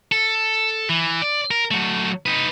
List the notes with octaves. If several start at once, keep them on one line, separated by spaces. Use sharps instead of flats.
A4
E3
D5
A#4
F#3 A3
D#4 B4